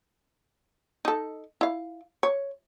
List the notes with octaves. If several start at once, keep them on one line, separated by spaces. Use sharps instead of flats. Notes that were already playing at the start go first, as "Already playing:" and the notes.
D#4 A4
E4 F5
C#5